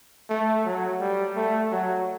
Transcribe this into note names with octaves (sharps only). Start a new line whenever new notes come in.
A3
F#3
G3
A3
F#3